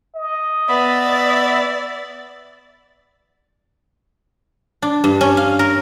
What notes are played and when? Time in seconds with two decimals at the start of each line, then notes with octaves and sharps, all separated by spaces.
0.15 D#5
0.69 B3 D5 E5 B5
4.82 D4
5.04 G2
5.21 C#4
5.37 F5
5.59 A#4